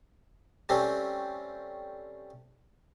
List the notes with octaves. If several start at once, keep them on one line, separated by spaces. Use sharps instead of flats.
G3 A3 C4 C#4